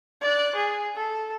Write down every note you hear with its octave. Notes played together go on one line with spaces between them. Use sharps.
D5 F#6
G#4
A4